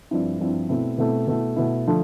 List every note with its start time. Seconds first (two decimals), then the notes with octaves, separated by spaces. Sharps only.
0.11 G2 F3 C4 E4
0.40 G2 F3 C4 E4
0.69 B2 A3 C4 E4
0.98 B2 A3 C4 E4
1.27 B2 A3 E4
1.56 B2 A3 E4
1.87 D3 F3 A3